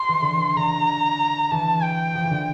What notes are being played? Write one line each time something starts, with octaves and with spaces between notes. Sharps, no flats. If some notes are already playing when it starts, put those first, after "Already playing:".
Already playing: C6
E3
D3
E3
D3 A#5
E3 A5
G5
F3
E3
D3